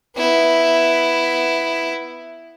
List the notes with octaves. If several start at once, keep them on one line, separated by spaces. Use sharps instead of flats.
B3 E4